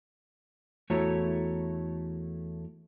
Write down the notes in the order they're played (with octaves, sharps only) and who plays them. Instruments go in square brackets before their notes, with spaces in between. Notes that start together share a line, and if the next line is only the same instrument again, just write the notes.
[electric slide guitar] E2 A3 E4 F#4 C#5 A#5